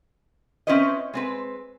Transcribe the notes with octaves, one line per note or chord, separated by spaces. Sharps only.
C4 C#4 E4 B4 C#5 D#5
G#3 C4 B4